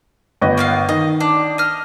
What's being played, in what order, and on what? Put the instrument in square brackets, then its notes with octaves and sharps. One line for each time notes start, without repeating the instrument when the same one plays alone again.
[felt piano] G1 B4 D#5
[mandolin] A#3 B3 F5
[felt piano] D#3 [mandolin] D#5
[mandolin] D4
D#5 F6